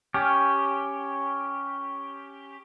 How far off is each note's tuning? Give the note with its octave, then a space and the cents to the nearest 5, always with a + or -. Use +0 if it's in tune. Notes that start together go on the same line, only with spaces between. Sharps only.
C#4 +0 G4 +0